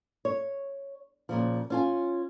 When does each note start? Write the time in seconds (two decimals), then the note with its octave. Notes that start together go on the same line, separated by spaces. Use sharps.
0.25 C#5
1.29 A#2 C#3 F3
1.70 C#4 F4 G#5